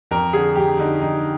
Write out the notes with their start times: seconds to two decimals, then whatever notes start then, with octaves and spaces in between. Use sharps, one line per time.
0.11 F2 A#4
0.33 D3 G#4
0.56 F2 G4
0.79 D3 D#4
1.01 F2 D#4